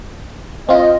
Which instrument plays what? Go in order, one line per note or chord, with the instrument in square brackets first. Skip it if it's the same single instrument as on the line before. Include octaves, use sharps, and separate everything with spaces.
[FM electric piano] C4 F4 [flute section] D#5